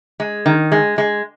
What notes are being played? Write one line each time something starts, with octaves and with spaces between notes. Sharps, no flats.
G#3
D#3
G#3
G#3